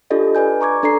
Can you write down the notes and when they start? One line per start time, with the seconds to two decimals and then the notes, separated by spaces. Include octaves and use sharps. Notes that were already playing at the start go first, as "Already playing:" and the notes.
0.10 D4 F4 G4 A4 D5 D#5
0.35 B4 D5 G#5 G6
0.61 A#5 C#6 D6 G#6
0.83 D4 A4 D5 A#5 C7